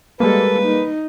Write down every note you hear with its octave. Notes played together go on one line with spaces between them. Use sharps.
G3 G#3 A#3 A4 B4
D#4